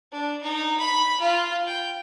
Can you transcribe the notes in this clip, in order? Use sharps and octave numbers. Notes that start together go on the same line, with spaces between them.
D4
D#4
B5
F4
G5